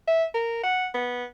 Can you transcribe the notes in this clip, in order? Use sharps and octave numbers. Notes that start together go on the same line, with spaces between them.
E5
A#4
F#5
B3